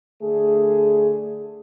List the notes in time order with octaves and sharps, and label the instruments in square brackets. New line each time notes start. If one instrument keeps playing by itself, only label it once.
[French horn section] D3 A3 G#4